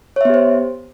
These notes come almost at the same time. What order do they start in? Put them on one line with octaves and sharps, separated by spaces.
C#5 E5 B3 G4 C5